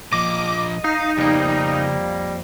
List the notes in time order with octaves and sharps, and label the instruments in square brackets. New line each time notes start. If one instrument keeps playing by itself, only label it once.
[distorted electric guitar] A#2 F3 [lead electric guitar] D#5 [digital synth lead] D6
[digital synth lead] D#4 [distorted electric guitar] F5
[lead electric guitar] F2 A#3 [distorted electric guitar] C#3 C5 [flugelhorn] G3